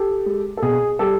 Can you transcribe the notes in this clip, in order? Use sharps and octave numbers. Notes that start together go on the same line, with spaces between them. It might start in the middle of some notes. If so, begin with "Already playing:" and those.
Already playing: G4 A4
G#3
A4
B2 G#4
G3 G4 A4